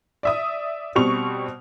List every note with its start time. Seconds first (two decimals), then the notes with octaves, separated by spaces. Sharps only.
0.23 D5 E5 D#6
0.95 B2 G3 C4 C#6 F7